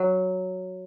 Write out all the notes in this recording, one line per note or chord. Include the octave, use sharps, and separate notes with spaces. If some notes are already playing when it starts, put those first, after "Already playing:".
Already playing: F#3